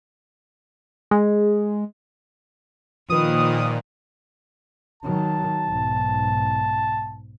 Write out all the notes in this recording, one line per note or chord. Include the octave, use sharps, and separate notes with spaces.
G#3
A#2 D#3 F3 B4 D#6
D#3 F#3 A5
B1 G#2